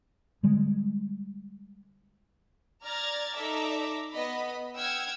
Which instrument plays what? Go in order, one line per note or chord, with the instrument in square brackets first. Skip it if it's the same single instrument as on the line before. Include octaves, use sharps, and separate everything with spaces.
[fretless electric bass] D3 G3 G#3
[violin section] D5 A#5 F6 G#6 A6
D#4 A4 D5 E5 A#5 D6
B3 D#5 B5
F#5 G5 E6 F6 G#6